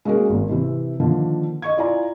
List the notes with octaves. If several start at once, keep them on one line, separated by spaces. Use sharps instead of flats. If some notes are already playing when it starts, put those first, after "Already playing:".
G#3 A#3 C#4 F#4 G#4 A#4
G#1
C3 E3
D3 D#3 F3 A#3
D#5 C#6 G#6
E4 F4 D5 G#5 A#5